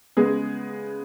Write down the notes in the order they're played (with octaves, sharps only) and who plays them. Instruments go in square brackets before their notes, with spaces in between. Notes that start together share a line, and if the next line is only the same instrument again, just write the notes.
[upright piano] C#3 G#3 B3 G#4